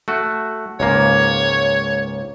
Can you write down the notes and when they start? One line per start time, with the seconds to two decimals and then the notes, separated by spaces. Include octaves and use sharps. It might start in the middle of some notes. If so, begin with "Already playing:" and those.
0.08 A3 F#4
0.80 C#2 G#2 A#3 C#5